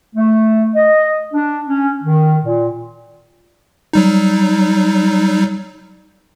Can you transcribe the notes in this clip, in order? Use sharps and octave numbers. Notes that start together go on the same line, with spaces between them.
A3
D#5
D4
C#4
D#3
A#2
F#3 G3 D#4